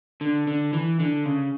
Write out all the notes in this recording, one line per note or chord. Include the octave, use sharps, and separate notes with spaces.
D3
D3
E3
D3
C#3